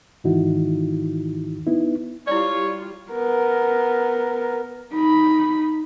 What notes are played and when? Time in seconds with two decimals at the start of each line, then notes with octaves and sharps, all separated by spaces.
0.24 G#2 D#3 E3 D#4 E4 F#4
1.67 B3 D#4 E4
2.27 G3 E4 F4 C#5 D5
3.12 B3 A#4
4.93 D#4 B5